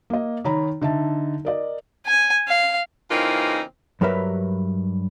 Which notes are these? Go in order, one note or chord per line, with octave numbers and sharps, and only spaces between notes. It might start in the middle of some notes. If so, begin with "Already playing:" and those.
A#3 D#5
D#3 C#5 A#5 B5
D3 D#4 E5 A5
A#4 D5 D#5
G#5
F5
C#3 E3 A#3 C4 D#4 F4
G2 F#3 G4 A#4 B4 E5